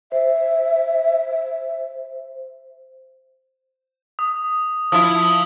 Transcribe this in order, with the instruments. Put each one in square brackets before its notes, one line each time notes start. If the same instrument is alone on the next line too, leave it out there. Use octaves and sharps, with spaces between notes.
[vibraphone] C5 [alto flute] E5
[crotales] D#6
[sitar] F3 E4 [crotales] D#6